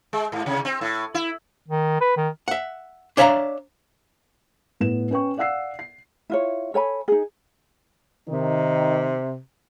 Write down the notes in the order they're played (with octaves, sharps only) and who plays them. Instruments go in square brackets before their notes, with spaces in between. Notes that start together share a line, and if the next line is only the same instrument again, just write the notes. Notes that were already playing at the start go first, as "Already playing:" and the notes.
[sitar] G#3
G#2
C3
C4
A2
E4
[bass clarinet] D#3
B4
D#3
[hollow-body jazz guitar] E5 F#5
D4 C#5 E5 F5 A5 A#5
[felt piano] A2 B3 E7
C#4 B4 G5 C#6
D5 F5 F#5 E6 C7
C7
[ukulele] E4 F4 C#5
A4 C#5 G#5 B5
D#4 G#4
[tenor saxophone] C3 [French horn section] D#3 D#4